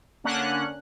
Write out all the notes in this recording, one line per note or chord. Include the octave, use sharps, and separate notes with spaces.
D3 A#3 C#4 D4 F#5 F#6